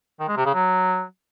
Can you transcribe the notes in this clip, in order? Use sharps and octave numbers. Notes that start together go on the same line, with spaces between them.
D#3
G#3
C3
C#3
F#3